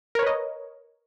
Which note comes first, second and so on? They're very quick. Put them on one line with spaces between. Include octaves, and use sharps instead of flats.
A#4 C#5 B4 D#5